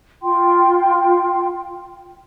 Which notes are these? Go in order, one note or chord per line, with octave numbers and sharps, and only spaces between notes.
F4 G5 C6